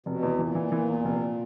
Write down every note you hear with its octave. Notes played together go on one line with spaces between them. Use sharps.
F1 B2
E2
A#2 E3
E3
E3
E2
F1